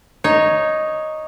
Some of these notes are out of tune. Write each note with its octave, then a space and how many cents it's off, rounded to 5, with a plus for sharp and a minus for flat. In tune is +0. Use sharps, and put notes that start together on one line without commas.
D#4 +0 C#5 +0